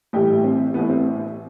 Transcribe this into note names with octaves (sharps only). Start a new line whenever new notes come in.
A1 A2 E3 G3 G4
C4
A1 A2 E3 B3
C4